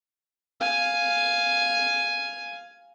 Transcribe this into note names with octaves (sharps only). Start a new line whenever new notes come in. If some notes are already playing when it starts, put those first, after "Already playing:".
F5 G#5